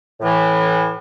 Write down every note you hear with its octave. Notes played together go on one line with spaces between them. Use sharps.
A2 E3